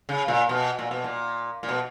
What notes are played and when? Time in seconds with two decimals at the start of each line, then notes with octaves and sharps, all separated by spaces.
0.09 C#3
0.28 A#2
0.49 B2
0.79 A#2
0.91 B2
1.04 A#2
1.63 A#2
1.69 B2